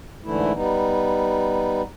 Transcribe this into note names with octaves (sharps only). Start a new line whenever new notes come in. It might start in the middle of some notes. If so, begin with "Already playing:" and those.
G#2 D3 E3 A3 E4
G3 B3 D#4